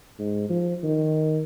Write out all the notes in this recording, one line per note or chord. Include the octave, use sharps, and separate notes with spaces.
G#2
F3
D#3